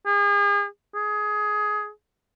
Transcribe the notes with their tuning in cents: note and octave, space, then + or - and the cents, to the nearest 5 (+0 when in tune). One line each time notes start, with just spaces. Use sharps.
G#4 -40
G#4 +15